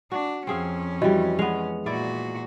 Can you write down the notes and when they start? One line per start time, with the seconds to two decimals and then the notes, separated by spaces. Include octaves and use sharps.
0.12 D4 F#4
0.47 F2 C4 C#4 G#4 F5
1.02 E3 G3 F#4 D#5
1.39 G#3 B3 F7
1.86 A#2 E4 F#4 D5